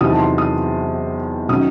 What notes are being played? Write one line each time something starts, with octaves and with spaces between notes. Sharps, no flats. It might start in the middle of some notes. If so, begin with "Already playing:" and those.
E2 C3 D#3 F#3 D#6
A5
C6
D#6
D#3 F#3 C#4 D#6